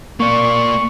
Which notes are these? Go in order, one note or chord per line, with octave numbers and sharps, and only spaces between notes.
A#3 D5 C#6